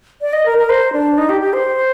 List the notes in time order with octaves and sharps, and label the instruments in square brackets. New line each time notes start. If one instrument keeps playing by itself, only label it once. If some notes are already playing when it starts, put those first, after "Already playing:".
[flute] D5
D#5
A#4
A#4
C5
D4
D#4
G4
G4
C5